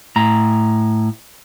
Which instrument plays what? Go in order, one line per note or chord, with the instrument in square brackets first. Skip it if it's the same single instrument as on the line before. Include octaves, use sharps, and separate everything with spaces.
[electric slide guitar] A2 A#5